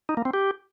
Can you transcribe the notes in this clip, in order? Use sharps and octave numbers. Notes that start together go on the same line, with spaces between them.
D#4
A#3
C4
G4